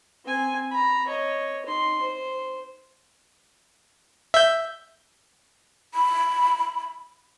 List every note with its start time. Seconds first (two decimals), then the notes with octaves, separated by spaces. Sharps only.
0.25 C4 G#5
0.71 A#5 B5
1.08 C#5 D#5
1.66 D#4 C6
2.02 C5
4.34 E5 G6
5.94 B5